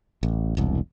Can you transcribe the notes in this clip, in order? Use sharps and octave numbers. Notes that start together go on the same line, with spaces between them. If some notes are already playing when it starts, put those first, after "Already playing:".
A1
E1 C2